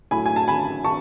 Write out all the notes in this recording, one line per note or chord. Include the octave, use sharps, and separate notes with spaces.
A2 F#3 A3 G#5 B5
G#5
A5
G#5 B5
A5 C#6